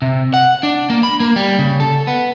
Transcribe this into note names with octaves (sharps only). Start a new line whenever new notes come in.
C3
F#5
D4
A#3
B5
A#3
G3
C#3
A4
B3